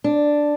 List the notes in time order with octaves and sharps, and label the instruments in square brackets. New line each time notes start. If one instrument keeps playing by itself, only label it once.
[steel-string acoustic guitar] D4